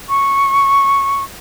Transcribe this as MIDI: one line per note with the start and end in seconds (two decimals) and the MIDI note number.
0.09 1.23 85